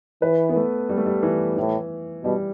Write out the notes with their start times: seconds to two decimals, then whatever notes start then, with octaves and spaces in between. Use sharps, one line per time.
0.22 E3 B4
0.49 B3
0.56 A3
0.89 G3
0.97 A3
1.06 G3
1.23 E3
1.57 A2 E3
2.23 B2 G3